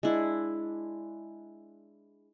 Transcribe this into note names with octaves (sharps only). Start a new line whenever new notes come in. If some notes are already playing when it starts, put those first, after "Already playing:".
G#3 D4 E4